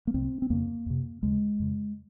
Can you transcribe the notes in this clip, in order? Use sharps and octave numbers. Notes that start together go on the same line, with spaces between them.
A#3
C2 C3 C4
C4
F2 C#3 A#3
F2 C3
D#2 C#3 G#3
F2 C#3